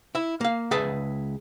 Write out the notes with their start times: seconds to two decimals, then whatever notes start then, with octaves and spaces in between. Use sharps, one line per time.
0.15 E4 E5
0.41 A#3 F5
0.71 C#2 G#4 B4 E5 A5